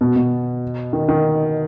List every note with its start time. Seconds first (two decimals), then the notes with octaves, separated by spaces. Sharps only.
0.01 B2
0.16 B2
0.93 D#3
1.09 D#3